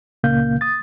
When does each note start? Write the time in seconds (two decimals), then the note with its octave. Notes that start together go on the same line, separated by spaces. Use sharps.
0.24 C#2 A#2 C#3 A#3 F5 G6
0.61 D#6 A6